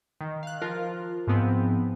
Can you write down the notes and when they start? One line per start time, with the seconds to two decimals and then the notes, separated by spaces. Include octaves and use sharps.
0.21 D#3
0.43 F5 F#6
0.62 F3 F4 A#4
1.27 G#2 F3 B3 C4